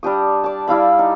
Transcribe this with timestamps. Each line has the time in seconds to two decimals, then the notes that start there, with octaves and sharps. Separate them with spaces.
0.03 G3 D4 G4 D#6
0.44 D5 A5
0.67 G3 E4 F5 B5
0.99 D#4